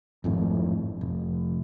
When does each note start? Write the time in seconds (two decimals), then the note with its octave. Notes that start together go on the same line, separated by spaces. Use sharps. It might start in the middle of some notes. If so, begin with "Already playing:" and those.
0.24 G#1 F2 A2
1.01 F1